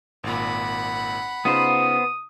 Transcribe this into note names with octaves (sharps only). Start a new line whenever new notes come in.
G#1 A#2 F#5 B5
C#3 B3 D#4 F4 C5 D#6